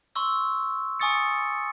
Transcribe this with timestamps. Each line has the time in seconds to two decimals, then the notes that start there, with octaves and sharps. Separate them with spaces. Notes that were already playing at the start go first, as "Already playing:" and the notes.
0.16 C6 C#6 E6
1.00 G#5 C#6 D#6 A6 C#7